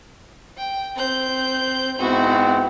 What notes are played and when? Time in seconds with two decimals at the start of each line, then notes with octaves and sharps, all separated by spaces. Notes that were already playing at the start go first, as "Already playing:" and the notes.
0.58 G5
0.96 C4 G6
1.99 G#2 B3 C4 E4 F#4